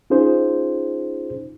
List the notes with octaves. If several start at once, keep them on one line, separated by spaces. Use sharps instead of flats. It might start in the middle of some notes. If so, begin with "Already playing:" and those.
C#4 D#4 F4 G#4 C5